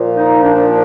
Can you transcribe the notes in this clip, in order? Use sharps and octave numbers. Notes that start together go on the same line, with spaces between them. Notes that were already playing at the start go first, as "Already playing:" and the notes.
Already playing: A#2 F3
D#4
D4